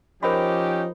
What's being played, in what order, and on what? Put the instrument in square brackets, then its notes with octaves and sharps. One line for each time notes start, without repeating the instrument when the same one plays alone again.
[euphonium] F3 [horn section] C#4 D#4 G4 [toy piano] A#4 C5 B5